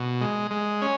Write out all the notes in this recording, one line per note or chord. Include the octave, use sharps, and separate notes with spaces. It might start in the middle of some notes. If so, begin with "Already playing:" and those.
Already playing: B2
G#3
G#3
C#4